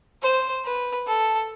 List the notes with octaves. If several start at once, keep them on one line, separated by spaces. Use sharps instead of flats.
C5
B4
A4